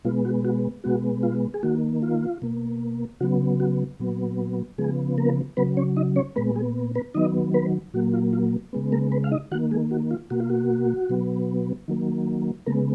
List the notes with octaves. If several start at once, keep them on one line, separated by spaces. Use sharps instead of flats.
B2 G#3 B3 F4
F#4
F#4
B2 G#3 B3 F#4
F4
G#4
D#3 A#3 F#4
F4
B2 A#3
C#3 F#3 B3 F#4
F#4
A#2 F#3 B3
C#3 F3 G#3 B3 G#4
A#3 A#4
C#3 F#3 B3 B4
C#4 C#5
D#4 D#5
C#4 C#5
A#2 G#3 B3 B4
G#3 G#4
B3 B4
D#3 F#3 B3 D#4 D#5
B3 B4
A#2 F#3 A#3 F#4
F4
F4
C#3 G#3 B3
A#3 A#4
B3 B4
F5
D#4 D#5
D#3 A#3 F#4 F#5
G#3 G#4
F#4
F4
B2 A#3 F#4
F4
F#4
B2 F#3 B3
D#3 F#3 A#3
C#3 G#3 A#3 B3 A#4